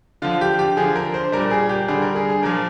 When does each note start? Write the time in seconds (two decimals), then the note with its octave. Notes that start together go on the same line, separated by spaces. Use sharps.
0.22 D3 F3 F4
0.41 G4
0.59 G4
0.77 D3 F3 G#4
0.96 A#4
1.14 C5
1.32 A#2 G3 A#4
1.51 G#4
1.69 G4
1.88 D3 G3 G#4
2.02 A#4
2.15 G#4
2.29 G#4
2.43 A#2 F3 A#4